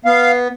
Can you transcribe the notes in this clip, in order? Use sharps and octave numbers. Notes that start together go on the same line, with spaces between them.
B3 F5